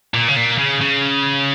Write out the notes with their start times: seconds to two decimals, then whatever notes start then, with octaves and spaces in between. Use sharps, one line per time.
0.14 A#2
0.28 C#3
0.36 A#2
0.58 C#3
0.81 C#3